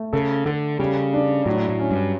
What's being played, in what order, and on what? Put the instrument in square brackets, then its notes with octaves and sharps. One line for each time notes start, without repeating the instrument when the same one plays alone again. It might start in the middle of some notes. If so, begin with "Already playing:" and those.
Already playing: [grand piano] A3
[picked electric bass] C#3 [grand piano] A4
[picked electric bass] D3 [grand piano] A4
[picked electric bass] C#3 [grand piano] G3
[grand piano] D4
[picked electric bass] A2 [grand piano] F#3
[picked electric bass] A2
[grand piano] C#4
[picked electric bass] G2